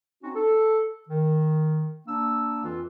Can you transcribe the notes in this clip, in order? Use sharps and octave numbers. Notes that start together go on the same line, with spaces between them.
C4 C#4 D#4 F#4
A4
D#3
A#3 D4 E6
F2 E3 F4